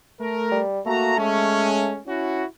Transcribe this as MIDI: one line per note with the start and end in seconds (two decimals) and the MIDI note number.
0.20 0.61 57
0.20 0.61 70
0.51 0.80 55
0.86 1.99 57
0.86 1.14 58
0.86 1.14 66
0.86 1.14 82
1.17 1.99 56
1.17 1.99 61
2.07 2.44 61
2.07 2.44 64
2.07 2.44 66